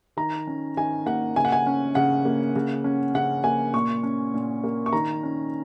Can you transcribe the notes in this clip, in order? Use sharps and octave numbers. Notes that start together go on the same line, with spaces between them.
D#3 A#5
C#4
D#3 G#5
A#3 F#5
C#3 G#5
F#5
G#5
C#4
C#3 F#5
A#3
C#3
C#4
C#3 F#5
A#3 G#5
A#2 C#6
C#4
A#2
A#3
C#6
D#3 A#5
C#4